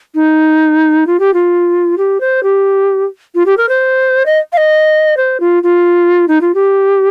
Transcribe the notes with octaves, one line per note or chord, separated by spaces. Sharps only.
D#4
F4
G4
F4
G4
C5
G4
F4
G4
A#4
C5
D#5
F5
D#5
C5
F4
F4
D#4
F4
G4